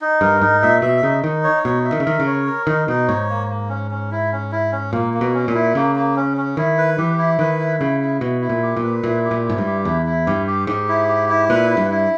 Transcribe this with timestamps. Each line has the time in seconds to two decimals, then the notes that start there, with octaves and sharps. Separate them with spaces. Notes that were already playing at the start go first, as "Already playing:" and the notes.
0.01 D#4
0.21 G2 A#4
0.41 G#2 D#4
0.63 A#2 E5
0.82 B2 E5
1.03 C#3 D#4
1.24 D#3 D#4
1.44 C#5
1.64 B2 D#4
1.85 E5
1.92 D#3
2.00 C#3
2.05 D#3 A#4
2.20 C#3
2.27 C#5
2.47 A#4
2.67 D#3 D#4
2.88 B2 D#4
3.08 G#2 C#5
3.30 A#3
3.50 A#3
3.69 C#4
3.91 C#4
4.12 E4
4.32 C#4
4.52 E4
4.72 C#4
4.93 A#2 A#3
5.14 A#3
5.21 B2
5.34 C#4
5.48 A#2
5.55 E4
5.75 C#3 A#3
5.96 A#3
6.16 C#4
6.37 C#4
6.57 D#3 E4
6.78 B4
6.98 E3 G4
7.18 E4
7.39 D#3 B4
7.59 E4
7.80 C#3 E4
8.01 E4
8.21 B2 E4
8.42 E4
8.49 A#2
8.62 G4
8.77 A#2
8.83 B4
9.04 A#2 E4
9.25 G4
9.31 A#2
9.45 G#2 E4
9.58 G2
9.65 G4
9.85 E2 E4
10.06 E4
10.27 G2 G4
10.47 G4
10.67 G#2 G4
10.89 E4
11.08 G4
11.29 E4
11.50 A#2 B4
11.70 E4
11.77 G2
11.91 E4